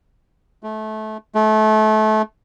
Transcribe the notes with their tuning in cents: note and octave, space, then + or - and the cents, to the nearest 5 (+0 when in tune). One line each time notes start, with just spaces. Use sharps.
A3 -25
A3 -25